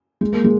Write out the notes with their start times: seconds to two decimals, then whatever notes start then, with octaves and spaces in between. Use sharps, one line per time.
0.21 G#3
0.33 A#3
0.44 G#3